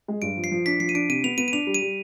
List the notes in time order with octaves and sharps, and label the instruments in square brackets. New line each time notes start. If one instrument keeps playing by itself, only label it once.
[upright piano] G#3
[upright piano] G2 [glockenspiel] D7
[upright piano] F3
[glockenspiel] C7
[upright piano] F3
[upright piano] D4 [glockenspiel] B6
[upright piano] F3 [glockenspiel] C7
[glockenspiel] D#7
[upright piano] D4 [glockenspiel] D7
[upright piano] C3 [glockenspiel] D#7
[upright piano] B3 [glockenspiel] F7
[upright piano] B3 [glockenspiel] D#7
[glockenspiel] D#7
[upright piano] D4 [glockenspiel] F7
[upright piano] G3
[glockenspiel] D#7
[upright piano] G3